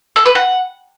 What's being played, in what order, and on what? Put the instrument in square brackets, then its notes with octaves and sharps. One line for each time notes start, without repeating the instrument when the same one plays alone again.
[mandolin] A4
B4
F#5